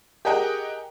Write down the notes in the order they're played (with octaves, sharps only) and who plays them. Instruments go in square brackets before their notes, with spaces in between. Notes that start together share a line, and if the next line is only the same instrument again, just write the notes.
[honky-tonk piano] G4 G#4 A#4 D#5 F#5 G5